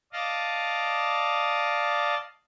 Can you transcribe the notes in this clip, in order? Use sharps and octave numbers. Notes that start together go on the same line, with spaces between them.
D5 D#5 F5 A5